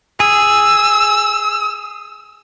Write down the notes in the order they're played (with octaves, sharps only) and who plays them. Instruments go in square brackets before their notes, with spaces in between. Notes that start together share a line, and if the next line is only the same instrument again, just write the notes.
[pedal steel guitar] G#4 [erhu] E6